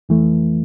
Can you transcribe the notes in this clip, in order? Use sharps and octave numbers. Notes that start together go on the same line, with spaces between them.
F2 E3 A3